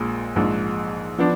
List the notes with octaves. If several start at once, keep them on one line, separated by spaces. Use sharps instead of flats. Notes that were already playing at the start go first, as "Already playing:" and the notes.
Already playing: A#1 A#2 G#3
A#1 G#2 F3
F3 B3 D4